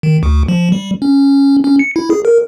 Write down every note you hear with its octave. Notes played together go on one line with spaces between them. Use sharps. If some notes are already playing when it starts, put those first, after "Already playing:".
D#3
D2
F3
G3
C#4
C#4
C#7
E4
G#4
A#4